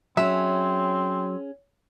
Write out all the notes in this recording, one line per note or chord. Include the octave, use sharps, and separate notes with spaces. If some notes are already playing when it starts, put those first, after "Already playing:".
F#3 C4 C#4 G#4 E5